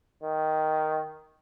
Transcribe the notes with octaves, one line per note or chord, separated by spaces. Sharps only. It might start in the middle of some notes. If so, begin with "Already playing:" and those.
D#3